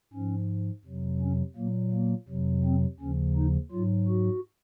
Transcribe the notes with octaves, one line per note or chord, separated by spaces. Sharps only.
G#2 F3 C#4
F2 C3 F#3
C#4
A#2 F#3 A#3
A#3
F2 C3 F#3
C4
D#2 C#3 F3 C#4
D#4
G#2 F#3 F4
F#4